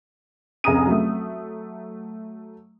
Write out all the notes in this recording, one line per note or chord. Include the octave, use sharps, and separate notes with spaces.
F1 C#2 G#4 A#5 D#6 D#7
F#3 A3